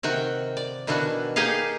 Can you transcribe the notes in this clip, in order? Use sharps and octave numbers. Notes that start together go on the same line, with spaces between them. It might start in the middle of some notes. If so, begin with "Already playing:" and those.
C3 D#3 F#4 G5
D5
B2 D#3 E3 D4 F#4
A#3 D#4 G4 G#4 D#5 F5